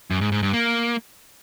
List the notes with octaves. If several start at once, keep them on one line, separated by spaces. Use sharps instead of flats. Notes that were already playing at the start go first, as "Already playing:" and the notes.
F#2
G#2
G#2
G2
A#3